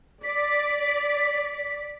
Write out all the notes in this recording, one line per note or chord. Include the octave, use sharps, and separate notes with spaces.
D5 B6